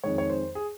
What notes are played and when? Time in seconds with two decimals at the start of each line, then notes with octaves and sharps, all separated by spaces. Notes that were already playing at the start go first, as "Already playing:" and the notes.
0.04 F2 D#3 G#3 C#5
0.18 C#5
0.30 C5
0.55 G#4